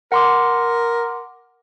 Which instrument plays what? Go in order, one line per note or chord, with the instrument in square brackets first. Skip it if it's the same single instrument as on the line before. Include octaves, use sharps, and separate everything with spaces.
[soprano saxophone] A#4 [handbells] F#5 C6 D6